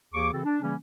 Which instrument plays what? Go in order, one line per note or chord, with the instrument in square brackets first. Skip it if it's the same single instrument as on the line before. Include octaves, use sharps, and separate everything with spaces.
[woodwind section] D#2 E3 A#3 G#4 C#6 D6
C#3 E3 C4 F#4 A4
D4
C#3 E3 G3 A#3 C#4